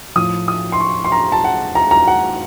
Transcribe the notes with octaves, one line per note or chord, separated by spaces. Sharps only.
A2 F3 D#6
D#6
C6
C#6
C6
A#5
A5
F#5
A#5
A#5
F#5